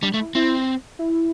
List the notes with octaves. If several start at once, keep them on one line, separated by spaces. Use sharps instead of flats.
G3 D4
A3
E4
C4 E4
E4